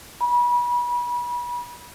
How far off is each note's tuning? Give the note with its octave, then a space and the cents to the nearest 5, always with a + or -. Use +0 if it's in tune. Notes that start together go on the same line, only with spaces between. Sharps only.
B5 -30